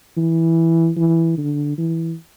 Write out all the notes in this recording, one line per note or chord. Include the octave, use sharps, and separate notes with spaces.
E3
E3
D3
E3